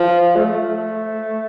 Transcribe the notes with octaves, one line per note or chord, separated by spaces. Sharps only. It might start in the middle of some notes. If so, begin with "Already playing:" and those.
Already playing: F3
A3